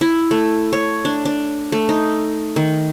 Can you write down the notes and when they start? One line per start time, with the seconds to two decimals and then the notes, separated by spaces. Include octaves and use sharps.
0.01 E4
0.31 A3
0.73 C#5
1.05 D4
1.25 D4
1.72 A3
1.89 D#4
2.56 D#3